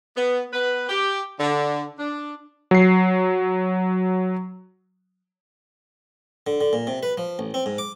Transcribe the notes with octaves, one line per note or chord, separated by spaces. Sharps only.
B3
B3 B4
G4
D3
D4
F#3 C7
D3
D3
A#2
C3
B4
F3
A1
C4
G#2
D6